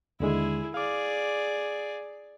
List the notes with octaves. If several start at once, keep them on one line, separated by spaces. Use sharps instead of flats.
D#2 D3 G#3 E4 G#4
G#4 D5 F5 D6